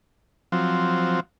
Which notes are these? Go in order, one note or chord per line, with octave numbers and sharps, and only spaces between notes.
F3 F#3 C4